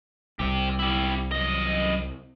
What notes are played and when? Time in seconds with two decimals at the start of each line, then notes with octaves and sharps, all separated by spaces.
0.40 C2 C4 G4
0.79 E4 G4
1.32 F#2 D#5